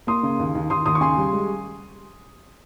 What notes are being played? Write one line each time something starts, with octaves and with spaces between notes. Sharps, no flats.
A#3 C6 D#6
C#3
D#2
D#2
D#2 C6 D#6
D#2 C6 D#6
C#6
C#3 G#5 C6
G3
G#3